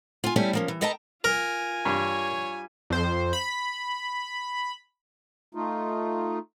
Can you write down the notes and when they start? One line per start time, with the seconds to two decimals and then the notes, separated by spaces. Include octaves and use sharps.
0.24 F4 G#5
0.36 G3 A3 C#4 E4 G4 G#5
0.53 F3 A#3 C#4
0.68 E3
0.81 A4 B4 D#5 G5 A5 A#5
1.24 F4 A#4 G#5
1.85 G2 C#5
2.90 F2 C5
3.33 B5
5.55 A3 D#4 F4